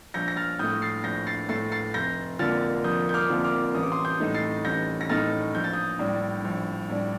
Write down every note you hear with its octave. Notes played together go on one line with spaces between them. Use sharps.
A#1 G6 A#6
A#6
F6 A6
A2 A3 D#6 G6
A6 C7
A#1 G6 A#6
A6 C7
A2 A3 A6 C7
A6 C7
F1 G6 A#6
F2 D3 F3 A#3 F6 A6
F1 D#6 G6
G6
D6 F6
F2 D3 F3 A#3
D6 F6
A1 D#6
D6
C6 D#6
D#6 G6
A2 A3 D#4
A6 C7
A1 G6 A#6
A#6
A2 A3 D#4 F6 A6
A#1 G6
A6
D#6 G6
A2 G3 D4
A#1
A2 G3 D4